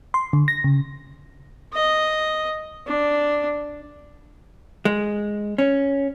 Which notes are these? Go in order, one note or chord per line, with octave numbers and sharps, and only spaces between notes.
C6
D3
A#6
C#3
D#5
D4
G#3
C#4